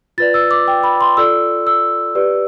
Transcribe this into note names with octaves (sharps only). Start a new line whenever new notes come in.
F4 B4 D5 A6
E6
D6
G5
B5
C6
F4 A4 D5 E6
E6
G4 B4 D5